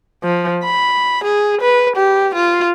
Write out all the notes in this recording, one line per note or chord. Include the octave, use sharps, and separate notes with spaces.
F3
B5
G#4
B4
G4
F4